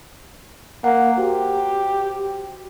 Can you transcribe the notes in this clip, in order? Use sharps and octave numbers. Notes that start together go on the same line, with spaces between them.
A#3 F#5
F#4 G4 C5